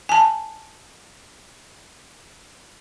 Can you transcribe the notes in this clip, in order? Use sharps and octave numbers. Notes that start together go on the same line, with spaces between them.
G#5 A5